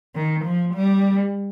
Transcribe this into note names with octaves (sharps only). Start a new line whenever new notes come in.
D#3
F3
G3